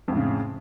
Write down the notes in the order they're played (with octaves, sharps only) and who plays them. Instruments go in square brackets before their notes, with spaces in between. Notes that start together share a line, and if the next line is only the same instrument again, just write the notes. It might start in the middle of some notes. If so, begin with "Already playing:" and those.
[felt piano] F2
A2
C#3